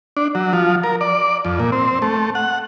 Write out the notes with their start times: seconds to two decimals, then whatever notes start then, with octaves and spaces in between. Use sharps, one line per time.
0.17 D4
0.35 F#3
0.53 F3
0.84 A#4
1.01 D5
1.45 F2
1.59 A#2
1.72 C4
2.02 A3
2.35 F#5